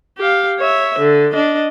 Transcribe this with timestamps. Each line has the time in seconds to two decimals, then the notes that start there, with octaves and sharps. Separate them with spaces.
0.18 G4 F5
0.59 C#5 E5
0.99 D3
1.32 D4 D#5